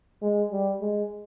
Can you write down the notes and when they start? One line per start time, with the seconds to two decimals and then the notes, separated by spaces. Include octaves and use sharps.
0.22 G#3
0.51 G3
0.81 G#3